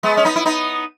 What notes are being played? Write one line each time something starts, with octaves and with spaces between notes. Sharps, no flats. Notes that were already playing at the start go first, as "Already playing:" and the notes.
G#3 B3
C#4
B3 D#4
E4
B3 D#4